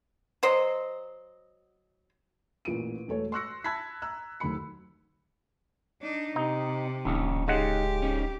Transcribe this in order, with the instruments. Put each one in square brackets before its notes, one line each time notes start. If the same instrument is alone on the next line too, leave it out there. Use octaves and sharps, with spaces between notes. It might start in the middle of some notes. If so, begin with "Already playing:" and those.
[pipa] F#3 C5 D#5
[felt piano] A1 A#2 B4 D7 D#7
E1 A3 A4 C#5
C6 C#6 E6 F#6 A#6 C#7
A5 B5 E6 F#6 G#6 B6
A#5 E6 F#6
D#1 D#2 F#3 A3 B5 C#7
[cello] D4 D#4
[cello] C3 [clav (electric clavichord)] D#4
[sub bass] D1 [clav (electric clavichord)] A#1 [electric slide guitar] D#3 C#4 D#4
[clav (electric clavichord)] C#3 G#3 F#5 [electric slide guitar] D#4 [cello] G4
[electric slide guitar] C#4 D#4